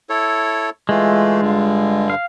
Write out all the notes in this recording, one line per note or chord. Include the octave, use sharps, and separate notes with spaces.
E4 A4 C#5
E3 G#3 A3 F4
G2 D3
F5